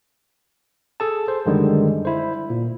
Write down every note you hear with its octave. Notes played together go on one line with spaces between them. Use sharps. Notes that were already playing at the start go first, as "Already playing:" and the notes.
G#4 A4 A5
C5
F#2 D3 D#3 G3 G#3
E4 C5
A#2